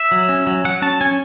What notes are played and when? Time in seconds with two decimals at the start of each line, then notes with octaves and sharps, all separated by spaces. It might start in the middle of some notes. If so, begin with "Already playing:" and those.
Already playing: E5
0.12 F#3
0.29 C#4
0.47 F#3
0.65 F#3 F#5
0.82 C#4 A5
1.01 C#4 G#5